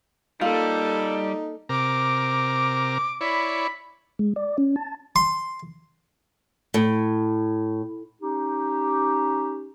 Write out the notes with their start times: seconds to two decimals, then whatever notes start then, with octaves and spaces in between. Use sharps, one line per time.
0.41 G3 A#3 D#4 F4 A4
1.69 C3 A#4 D6
3.21 E4 C#5 D5 B5
4.19 G#3
4.36 D5
4.58 C#4
4.76 A5
5.16 C6
6.74 A2
8.22 C#4 D#4 G4